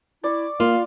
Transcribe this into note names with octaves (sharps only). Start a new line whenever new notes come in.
E4 D5 C#6
A#3 F4 F5